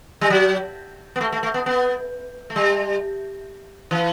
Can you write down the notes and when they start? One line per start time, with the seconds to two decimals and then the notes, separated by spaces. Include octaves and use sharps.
0.21 G3
0.30 F#3
1.16 B3
1.21 A3
1.32 A3
1.43 A3
1.54 B3
1.66 B3
2.50 A3
2.56 G3
3.91 E3